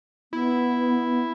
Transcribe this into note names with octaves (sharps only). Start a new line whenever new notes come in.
B3 E4